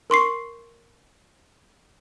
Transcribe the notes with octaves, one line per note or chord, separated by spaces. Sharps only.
A#4 C6 C#6 C7